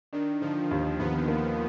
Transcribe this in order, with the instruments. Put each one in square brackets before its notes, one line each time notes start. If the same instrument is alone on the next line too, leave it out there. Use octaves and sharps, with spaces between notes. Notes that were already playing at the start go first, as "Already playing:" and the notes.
[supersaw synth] D#3 [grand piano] D4
[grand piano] D3 [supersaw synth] F3
[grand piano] D#2
[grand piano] D#2 [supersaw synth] B3
[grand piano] A#3